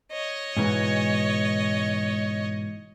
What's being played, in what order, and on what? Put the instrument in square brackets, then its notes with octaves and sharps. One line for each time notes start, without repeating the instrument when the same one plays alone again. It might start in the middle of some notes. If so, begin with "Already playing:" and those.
[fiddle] C#5 D#5
[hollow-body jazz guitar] G#2 B2 E3